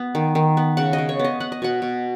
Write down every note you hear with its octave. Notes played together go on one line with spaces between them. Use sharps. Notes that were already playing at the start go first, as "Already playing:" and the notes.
Already playing: B3
D#3
D#3
B3
C#3 F#5
D#5
C#3
C#5
B3
D#5
B3 F#5
D#5
B2 F#5
B2